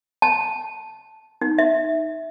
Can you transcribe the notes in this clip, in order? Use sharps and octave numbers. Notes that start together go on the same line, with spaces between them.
A5
D#4
E5